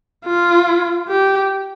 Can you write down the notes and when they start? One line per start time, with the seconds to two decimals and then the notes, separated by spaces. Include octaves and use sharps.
0.25 F4
1.08 G4